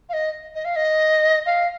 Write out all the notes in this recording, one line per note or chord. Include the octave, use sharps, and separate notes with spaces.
F5
D#5
D#5
F5
D#5
F5